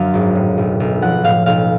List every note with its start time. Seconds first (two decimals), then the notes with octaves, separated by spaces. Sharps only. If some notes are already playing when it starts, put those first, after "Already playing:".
Already playing: F#2 D3 F#3 F5
0.14 G#1
0.35 A2
0.58 B1
0.80 B1
1.02 F3 F#5
1.24 A2 F5
1.46 B1 F5